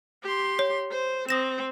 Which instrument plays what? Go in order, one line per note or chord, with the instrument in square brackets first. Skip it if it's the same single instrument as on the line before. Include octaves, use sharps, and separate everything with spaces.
[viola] G4 C6
[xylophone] C#5
[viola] C5
[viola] C4 [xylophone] D#6 A#6 E7